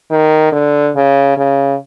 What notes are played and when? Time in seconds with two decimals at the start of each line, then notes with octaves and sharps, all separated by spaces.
0.11 D#3
0.52 D3
0.96 C#3
1.37 C#3